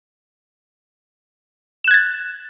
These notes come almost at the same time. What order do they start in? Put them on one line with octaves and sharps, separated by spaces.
E7 F#6 G#6 A6